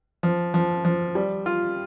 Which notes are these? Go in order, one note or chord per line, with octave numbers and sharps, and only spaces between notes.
F3
F3
F3
G3
F4